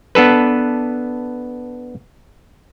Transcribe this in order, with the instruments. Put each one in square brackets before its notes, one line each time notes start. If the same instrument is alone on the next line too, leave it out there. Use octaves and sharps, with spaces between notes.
[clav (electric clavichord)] B3 D4 A4 B4